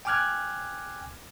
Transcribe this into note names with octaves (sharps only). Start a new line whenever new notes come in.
G5 G#5 D6 F6 F#6 G#6